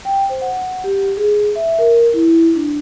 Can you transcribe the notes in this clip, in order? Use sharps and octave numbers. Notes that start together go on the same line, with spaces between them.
G5
C5
F#5
G4
G#4
E5
A#4
E4
D4